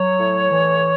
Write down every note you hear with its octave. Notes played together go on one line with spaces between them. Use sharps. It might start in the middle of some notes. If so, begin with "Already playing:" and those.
Already playing: F#3 C#5
A2
E3